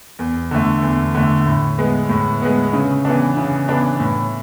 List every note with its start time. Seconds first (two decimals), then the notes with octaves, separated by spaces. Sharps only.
0.19 E2
0.51 D3 A3
0.82 E2
1.15 D3 A3
1.46 A2
1.78 G#3 B3
2.09 A2
2.41 G#3 B3
2.73 C#3
3.05 E3 B3 D4
3.37 C#3
3.68 E3 B3 D4
4.00 A2